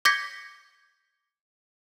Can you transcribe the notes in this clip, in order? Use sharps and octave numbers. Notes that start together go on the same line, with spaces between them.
D6 G6 G#6 A#6 B6 C#7